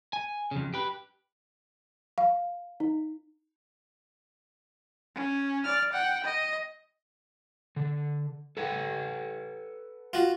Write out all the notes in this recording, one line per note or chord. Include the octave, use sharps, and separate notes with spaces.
G#5
F2 C#3
G4 B4
F5
D#4
C#4
D5 F6
F#5 G5
D#5
D3
A4 B4 F#5
F4 F#4